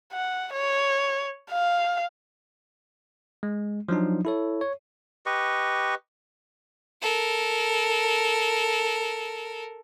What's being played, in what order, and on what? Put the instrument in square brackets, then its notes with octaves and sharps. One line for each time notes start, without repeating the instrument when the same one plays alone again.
[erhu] F#5
C#5
F5
[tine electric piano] G#3
F3 F#3 D4 D#4
E4 A4 C#5
C#5
[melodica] G4 B4 D#5 C#6
[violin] A4 A#4